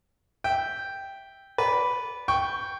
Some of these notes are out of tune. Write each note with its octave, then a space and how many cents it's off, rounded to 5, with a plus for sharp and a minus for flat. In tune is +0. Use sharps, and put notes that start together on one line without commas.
E5 -5 G5 +0
B4 +0 D5 -20
G5 +0 C#6 +0